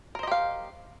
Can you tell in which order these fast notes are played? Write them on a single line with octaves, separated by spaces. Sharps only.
A#4 C5 D#5 G4 F5